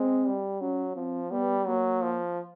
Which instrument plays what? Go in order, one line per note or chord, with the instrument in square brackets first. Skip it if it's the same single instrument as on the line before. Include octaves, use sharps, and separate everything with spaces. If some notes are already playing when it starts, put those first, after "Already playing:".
Already playing: [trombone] G#3 [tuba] C4
[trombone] G3
[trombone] F#3 [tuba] C#4
[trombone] F3 [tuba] C4
[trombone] G3 [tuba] B3
[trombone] F#3 [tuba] A#3
[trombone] F3